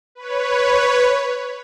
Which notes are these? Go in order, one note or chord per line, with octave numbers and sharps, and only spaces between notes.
B4 C#5